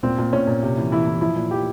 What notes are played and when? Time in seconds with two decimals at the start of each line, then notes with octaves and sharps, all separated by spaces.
0.03 A#2 C4
0.18 A#2
0.32 A#2 C#4
0.47 A#2
0.63 C3
0.77 E3
0.92 E3 E4
1.07 E3
1.21 F3 E4
1.36 A#2
1.51 F3 G4